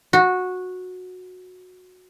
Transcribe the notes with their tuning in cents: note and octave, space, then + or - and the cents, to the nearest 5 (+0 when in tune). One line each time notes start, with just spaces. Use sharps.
F#4 -15